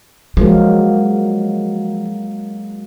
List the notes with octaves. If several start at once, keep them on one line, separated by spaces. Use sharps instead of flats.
F3 F#3 G#3 A#3